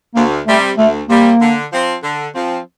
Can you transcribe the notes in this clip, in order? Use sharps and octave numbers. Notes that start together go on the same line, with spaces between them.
D2 A#3
C3 G3 A3
D2 A3
C3 G3 A#3
D3
F3 C4
D3
F3 C4